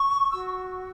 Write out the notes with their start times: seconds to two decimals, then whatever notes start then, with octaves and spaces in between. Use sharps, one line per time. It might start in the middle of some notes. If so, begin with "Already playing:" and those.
Already playing: C#6
0.32 F#4 E6